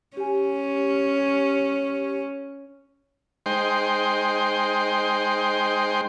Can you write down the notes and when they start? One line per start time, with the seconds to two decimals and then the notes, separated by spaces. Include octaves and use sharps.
0.17 C#4 G4 G#5
3.46 G#3 D#4 C5 G5 C6